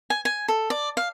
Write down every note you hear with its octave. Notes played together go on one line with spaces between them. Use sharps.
G#5
G#5
A4
D5
F5